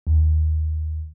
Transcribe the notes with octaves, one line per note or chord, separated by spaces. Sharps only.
D#2